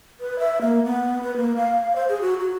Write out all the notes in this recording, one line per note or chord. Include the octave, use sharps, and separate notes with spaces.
B4
E5
A#3
B3
B4
A#3
F5
C5
G#4
F#4
F#4